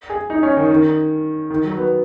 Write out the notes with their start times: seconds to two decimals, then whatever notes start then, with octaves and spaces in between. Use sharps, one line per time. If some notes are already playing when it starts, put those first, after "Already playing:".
0.10 G#4
0.30 D#4
0.43 C#4
0.57 D#3
0.71 D#3
1.50 D#3
1.64 F#3
1.77 B3